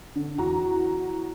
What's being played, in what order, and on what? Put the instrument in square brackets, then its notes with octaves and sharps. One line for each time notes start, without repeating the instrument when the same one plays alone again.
[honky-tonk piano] D3
E2 F#4 A#5